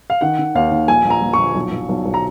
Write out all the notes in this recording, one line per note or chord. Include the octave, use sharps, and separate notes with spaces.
F5
D#3 F#5
D#3
D#2 F5
D#2
A#1 G#5
A#1
A#5
A#1
A#1 C#6
B1
B1
B1
B1
A#5